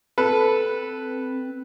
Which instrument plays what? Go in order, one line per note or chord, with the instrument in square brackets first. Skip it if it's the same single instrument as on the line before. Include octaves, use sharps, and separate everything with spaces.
[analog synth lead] C4 [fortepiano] A4 B4